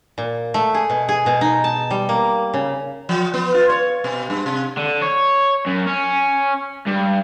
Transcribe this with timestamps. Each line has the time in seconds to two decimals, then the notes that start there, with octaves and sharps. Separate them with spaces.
0.18 A#2
0.54 A3
0.74 G#4
0.90 B2
1.09 G#4
1.26 B2
1.41 D#4
1.64 A5
1.91 G3
2.09 A#3
2.54 C#3
3.09 F3
3.34 B3
3.54 F4
3.70 C#5
4.04 B2
4.30 G2
4.46 C3
4.78 D3
5.02 C#5
5.66 F#2
5.86 C#4
6.87 G2